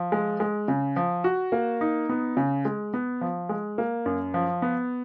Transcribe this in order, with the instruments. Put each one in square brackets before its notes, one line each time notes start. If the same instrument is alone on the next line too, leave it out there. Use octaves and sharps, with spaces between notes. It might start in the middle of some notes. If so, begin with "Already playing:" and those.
Already playing: [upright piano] F3
G#3
G#3
C#3
F3
F#4
A#3
D#4
B3
C#3
G#3
B3
F3
G#3
A#3
F#2
F3
B3